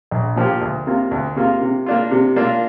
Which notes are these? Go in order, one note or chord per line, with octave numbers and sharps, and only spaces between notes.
A#1
A#2 F3 A#3 G4
D2
C3 A#3 F4
D2
C3 A#3 F4
C3
A#3 D4 F4
C3
A#3 D4 F4